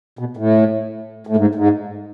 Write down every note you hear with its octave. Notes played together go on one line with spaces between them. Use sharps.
B2
A2
A2
G#2
G#2